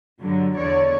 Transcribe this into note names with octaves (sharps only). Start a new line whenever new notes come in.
G2 D3 F#3
E2 D3 C#5 D5